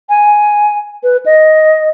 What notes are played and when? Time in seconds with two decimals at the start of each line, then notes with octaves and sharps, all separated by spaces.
0.09 G#5
1.03 B4
1.26 D#5